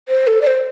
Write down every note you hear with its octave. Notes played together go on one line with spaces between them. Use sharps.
C5
A4
D5
C5